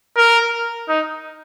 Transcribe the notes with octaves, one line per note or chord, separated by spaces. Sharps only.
A#4
D#4